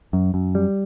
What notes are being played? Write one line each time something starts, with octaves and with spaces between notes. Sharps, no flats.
F#2
F#2
G3